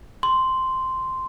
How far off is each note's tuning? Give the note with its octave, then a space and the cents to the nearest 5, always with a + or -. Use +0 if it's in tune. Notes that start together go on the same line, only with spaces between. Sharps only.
C6 -5